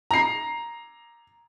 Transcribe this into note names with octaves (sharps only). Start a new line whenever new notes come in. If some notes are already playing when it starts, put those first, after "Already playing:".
A#5 C7